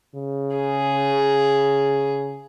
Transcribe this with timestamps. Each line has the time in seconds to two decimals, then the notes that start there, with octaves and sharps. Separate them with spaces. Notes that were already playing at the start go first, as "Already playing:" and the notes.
0.15 C#3
0.55 G#4